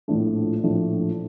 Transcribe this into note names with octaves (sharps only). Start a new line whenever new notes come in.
A#1 A2 F3 A3 D4
A#1 A2 F3 A3 D4